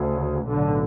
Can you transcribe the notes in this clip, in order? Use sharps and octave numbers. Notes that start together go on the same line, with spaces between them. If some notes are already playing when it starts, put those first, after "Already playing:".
Already playing: D2 C#3
B1 A2 D3